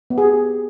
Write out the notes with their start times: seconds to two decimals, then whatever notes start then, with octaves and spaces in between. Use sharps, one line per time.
0.10 B3
0.18 G#4
0.25 G4